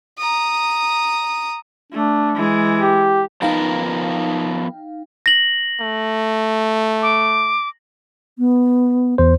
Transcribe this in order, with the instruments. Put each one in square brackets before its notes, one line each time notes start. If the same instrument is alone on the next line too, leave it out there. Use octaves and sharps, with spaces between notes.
[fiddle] A#5 D#6
[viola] A3 [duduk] D4
[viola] E3 G#3
[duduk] G4
[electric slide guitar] F3 B3 A#4 [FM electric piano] D#4 F5 G5
[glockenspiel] A#6 F#7
[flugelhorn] A3
[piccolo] D6
[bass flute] B3
[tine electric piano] E2 C5